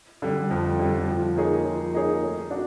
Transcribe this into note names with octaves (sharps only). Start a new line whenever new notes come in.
D3 G3
F2
D3 G3
F3
A#3 D#4 G#4 C#5
F3
A#3 D#4 G#4 C#5
A3
D4 F#4